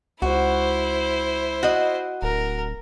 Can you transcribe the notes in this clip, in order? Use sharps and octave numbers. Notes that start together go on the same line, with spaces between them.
C#2 E4 F#4 C5
F#4 D#5
D1 A#4